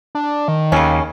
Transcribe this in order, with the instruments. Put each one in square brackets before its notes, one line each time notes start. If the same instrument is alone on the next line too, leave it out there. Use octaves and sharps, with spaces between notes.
[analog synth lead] D4
D#3
[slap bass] D#2 [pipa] C#3 C#4